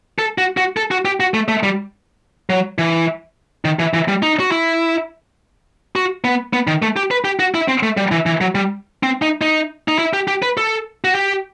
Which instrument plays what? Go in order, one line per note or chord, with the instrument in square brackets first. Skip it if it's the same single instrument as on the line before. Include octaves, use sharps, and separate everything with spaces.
[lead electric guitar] A4
F#4
F#4
A4
F#4
G4
F#4
A3
A3
G3
F#3
E3
D#3
E3
E3
G3
D#4
F#4
E4
F#4
B3
B3
D#3
A3
G4
B4
G4
F#4
E4
C4
A3
G3
E3
E3
F#3
G3
C4
D#4
D#4
D#4
E4
G4
G4
B4
A4
F#4
G4